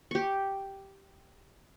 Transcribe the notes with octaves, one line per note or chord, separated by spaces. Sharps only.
G4 C#6